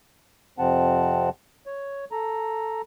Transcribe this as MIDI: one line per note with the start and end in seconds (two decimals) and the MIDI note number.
0.59 1.29 41
0.59 1.29 48
0.59 1.29 53
0.59 1.29 60
0.59 1.29 78
0.59 1.29 81
1.67 2.05 73
2.12 2.82 69
2.12 2.82 82